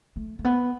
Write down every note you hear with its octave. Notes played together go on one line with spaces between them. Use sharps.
A3
A3
B3